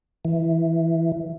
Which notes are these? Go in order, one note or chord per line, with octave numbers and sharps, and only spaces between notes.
E3